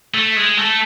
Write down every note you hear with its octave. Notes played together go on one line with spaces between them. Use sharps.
A3
G#3
A3